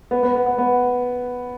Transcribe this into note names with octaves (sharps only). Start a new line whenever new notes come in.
B3
B3
B3
B3
B3